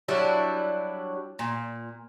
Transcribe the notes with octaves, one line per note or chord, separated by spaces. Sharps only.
F#3 G3 D4 E4
A#2